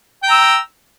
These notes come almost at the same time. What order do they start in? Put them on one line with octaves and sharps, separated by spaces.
G5 A#5 E6